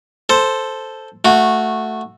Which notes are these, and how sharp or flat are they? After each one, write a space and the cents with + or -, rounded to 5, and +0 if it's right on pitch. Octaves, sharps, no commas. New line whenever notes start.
A4 +0 C5 +0
A3 +0 F#4 -10